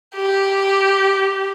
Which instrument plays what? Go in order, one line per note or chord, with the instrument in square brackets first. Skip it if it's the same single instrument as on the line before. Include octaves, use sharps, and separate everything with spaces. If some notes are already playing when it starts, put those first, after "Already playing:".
[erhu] G4